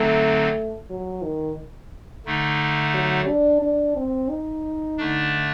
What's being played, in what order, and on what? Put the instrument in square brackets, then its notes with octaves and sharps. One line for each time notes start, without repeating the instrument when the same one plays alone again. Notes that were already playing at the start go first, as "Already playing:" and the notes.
Already playing: [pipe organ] D3 F#3 C4 D#4 [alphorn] A3
[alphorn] F#3
D#3
[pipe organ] D3 A3 D#4
[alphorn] F#3
D4
D4
C4
D#4
[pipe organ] D3 A3 D4